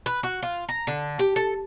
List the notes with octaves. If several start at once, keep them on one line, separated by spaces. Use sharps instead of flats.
B4
F#4
F4
A#5
D3
G4
A4